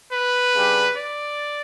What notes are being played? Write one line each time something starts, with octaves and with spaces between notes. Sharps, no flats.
B4
C#3 G3 D4
D5